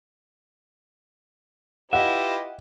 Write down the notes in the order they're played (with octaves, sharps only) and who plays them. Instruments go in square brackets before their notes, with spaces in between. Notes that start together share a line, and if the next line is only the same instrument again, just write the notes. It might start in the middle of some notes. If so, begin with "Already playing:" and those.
[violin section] E4 D#5 [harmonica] F4 G4 B4 [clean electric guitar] E5 [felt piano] F#5